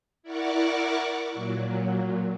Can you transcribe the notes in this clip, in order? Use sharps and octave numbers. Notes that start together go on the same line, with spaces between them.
E4 A#4 D5 F#5 C#6 D6
A#2 F#3